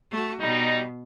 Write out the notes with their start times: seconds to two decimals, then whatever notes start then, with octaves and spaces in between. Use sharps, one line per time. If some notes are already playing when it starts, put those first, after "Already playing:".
0.11 A3 F#4
0.41 B2 G3 D#4